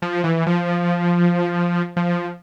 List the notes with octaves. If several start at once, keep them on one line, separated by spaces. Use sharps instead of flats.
F3
E3
F3
F3